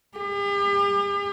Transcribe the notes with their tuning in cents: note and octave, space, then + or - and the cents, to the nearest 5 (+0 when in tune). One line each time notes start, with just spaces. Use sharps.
G4 +45